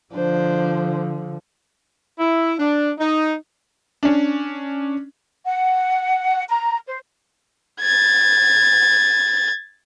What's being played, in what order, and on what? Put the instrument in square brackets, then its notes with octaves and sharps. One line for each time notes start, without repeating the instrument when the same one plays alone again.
[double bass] D3 F3 [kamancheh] D4 C5
[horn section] E4
D4
D#4
[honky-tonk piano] C#4 D4
[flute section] F#5
A#5
C5
[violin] G#6 A6